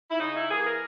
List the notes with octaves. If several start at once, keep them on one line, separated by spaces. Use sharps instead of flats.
E4
C#3 D#4
E4
E3 A#3 G#4
A#4